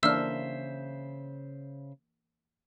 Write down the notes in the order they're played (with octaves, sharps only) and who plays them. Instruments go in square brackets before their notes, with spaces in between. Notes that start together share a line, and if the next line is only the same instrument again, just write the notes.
[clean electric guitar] C#3 C5 E5 [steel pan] E3 A#3 D4 [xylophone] E6 F6